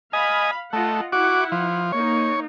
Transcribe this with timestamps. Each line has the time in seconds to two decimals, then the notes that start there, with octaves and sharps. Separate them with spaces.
0.13 D#5 F5 G#5 B5
0.73 A3 F4 D#5 F#5
1.12 E4 F#4 F#5 D6
1.52 F3
1.92 A#3 D#4 C#5